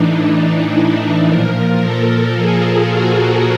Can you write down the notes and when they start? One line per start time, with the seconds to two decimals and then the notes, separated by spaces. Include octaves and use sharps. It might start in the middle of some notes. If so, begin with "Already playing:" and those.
Already playing: A2 E3 D4 D#4
0.73 E4
1.28 A#2 F3 A#4
1.82 A4
2.37 G#4
2.92 F#4